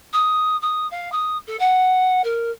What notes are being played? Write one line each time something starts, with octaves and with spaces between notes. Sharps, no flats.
D#6
D#6
F5
D#6
A4
F#5
A#4